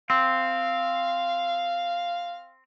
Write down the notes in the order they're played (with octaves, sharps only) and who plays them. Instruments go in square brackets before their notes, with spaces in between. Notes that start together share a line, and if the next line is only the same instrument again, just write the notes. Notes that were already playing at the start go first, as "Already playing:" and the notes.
[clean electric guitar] C4 [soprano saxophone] F5